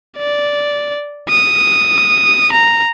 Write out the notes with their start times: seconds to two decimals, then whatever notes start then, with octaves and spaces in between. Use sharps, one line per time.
0.18 D5
1.30 D#6
2.52 A#5